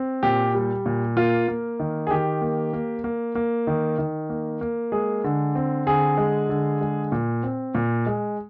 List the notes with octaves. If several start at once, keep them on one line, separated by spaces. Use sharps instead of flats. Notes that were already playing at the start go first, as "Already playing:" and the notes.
Already playing: C4
A#2 G4
G3
A#2
A#3 F4
A#3
D#3
G#4
D#3 G4
A#3
A#3
A#3
A#3
D#3
D#3
A#3
A#3
G#3 G#4
D3
C4
D3 G#4
G#3
D3
G#3
A#2
C4
A#2
G#3